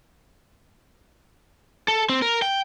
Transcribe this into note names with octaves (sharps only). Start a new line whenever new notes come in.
A4
C4
A#4
G5